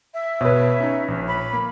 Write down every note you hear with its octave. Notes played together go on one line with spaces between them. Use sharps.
E5
B2 B4 C#5
C#4 D#4
A#1
B5
A#3